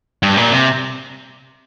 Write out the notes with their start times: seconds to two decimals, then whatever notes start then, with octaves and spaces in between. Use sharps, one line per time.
0.23 G2
0.37 A#2
0.52 C3